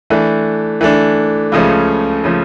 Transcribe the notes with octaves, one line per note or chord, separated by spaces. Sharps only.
E3 A3 D4
E3 A3 D4
C#2 C#3 F3 A3 C#4
C#3 F3 A3 C#4